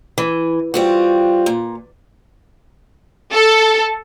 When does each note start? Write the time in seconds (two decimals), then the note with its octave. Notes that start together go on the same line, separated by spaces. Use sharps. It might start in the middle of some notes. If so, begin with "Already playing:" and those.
0.18 E3
0.74 G3 C4 F4 F#4
1.46 A#2
3.33 A4